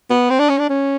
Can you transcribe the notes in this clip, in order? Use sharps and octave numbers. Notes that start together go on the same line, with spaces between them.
B3
C4
D4
C#4
D4
C#4